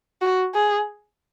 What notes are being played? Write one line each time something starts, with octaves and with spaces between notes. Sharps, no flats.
F#4
G#4